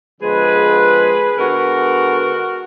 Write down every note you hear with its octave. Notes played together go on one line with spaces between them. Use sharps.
D3 F3 G#3 B3 G#4 B4
D3 G#3 B3 F#4 A#4